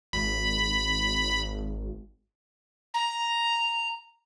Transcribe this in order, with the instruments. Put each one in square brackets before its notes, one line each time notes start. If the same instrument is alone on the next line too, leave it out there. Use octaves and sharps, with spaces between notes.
[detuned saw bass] G#1 [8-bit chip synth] B5
[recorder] A#5